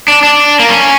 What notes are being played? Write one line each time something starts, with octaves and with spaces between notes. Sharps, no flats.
D4
D4
A#3
C#4